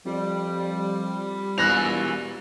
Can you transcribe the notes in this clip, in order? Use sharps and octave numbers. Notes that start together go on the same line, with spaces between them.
F2 G3
E1 A#2 E3 F#6 A#6 F7